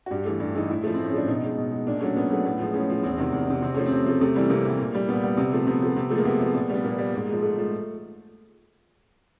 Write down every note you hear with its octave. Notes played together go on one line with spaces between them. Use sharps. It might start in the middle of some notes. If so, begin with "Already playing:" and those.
F#4
G2 G4
E3 A3
G2
E3 A3 D#4
A2 E4
F3 A3
C4
A2
C#4
F3 A3 D4
B2 D#4
G#3
B2
G#3
A#2 D4
F#3 A3 C#4
A#2 B3
F#3 A3
A2 B3
F3 G#3
A2 C#4
F3 G#3
E2 C4
C3 D#3
E2
C3 D#3
C3 C4
F3 A3 C#4
C4
C3
F3 A3
C3 A3
E3 G3
C3 A#3
E3 G3
A#2
G3
A#2 B3
G3
C3
F3 A3
C3 B3
F3 A3
C3
F3 G#3 A3
A#3
C3 B3
F3 G#3
A#2
G3 B3
A#2 A#3
G3
G#2
F3 G#3
G#2 A3
F3 G#3